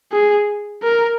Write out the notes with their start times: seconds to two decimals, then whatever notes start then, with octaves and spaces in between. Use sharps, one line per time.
0.12 G#4
0.83 A#4